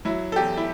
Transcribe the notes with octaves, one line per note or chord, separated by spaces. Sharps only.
F#3 E4
A4
E2 G4
E4